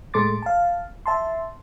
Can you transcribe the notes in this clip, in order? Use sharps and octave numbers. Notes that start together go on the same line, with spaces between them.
A2 G#3 A4 C6 D6 A6
F5 A5
E5 A5 C6